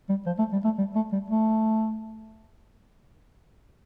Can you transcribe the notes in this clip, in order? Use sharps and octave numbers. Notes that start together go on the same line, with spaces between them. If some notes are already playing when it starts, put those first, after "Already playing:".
G3
F3
A3
G3
A3
G3
A3
G3
A3